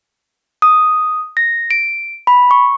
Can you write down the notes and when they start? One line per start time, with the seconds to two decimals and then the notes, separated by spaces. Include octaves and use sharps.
0.62 D#6
1.37 A#6
1.71 D7
2.27 B5
2.51 C#6